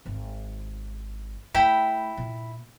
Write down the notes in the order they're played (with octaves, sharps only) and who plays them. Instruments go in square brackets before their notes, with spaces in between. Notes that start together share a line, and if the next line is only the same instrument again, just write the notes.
[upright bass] G#1 D#3
[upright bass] A3 [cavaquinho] E4 G5 B5
[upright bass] A#2